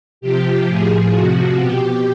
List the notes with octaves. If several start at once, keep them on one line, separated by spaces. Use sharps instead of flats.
C3 F3 G4
A2 F3 G#4
C3 F3 F#4
B2 G4